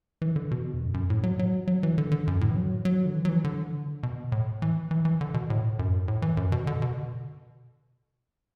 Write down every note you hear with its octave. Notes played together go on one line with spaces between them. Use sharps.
E3
D3
B2
E2
F#2
F#2
A2
F#3
F#3
F#3
E3
D3
D3
F#2
A2
E3
F#3
F#3
D3
E3
F#3
E3
D3
B2
A2
E3
E3
E3
D3
B2
A2
F#2
A2
E3
F#2
B2
D3
B2